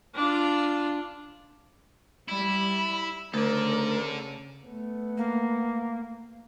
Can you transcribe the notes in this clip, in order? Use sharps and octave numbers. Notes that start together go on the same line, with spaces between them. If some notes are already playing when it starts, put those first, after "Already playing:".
D4 F4
G3 E4 B5
D2 C#3 A4 A#4 D5
A3 B3
A#3